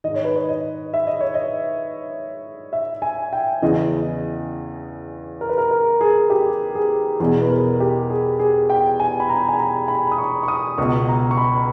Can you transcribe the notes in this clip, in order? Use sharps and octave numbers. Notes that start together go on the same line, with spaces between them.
G#2 D#3 D#5
C#5
B4
C#5
D#5
E5
D#5
C#5
D#5
E5
G#5
G5
E2 C#3 E3 D#5
A#4
B4
A#4
A#4
G#4
G4
G#4
E2 B2 G#4
B4
A#4
G4
G#4
G#4
G5
G#5
B5
A#5
G#5
A#5
B5
D#6
C#6
C#6
D#6
C#2 B2 C#6
A#5
C#6
B5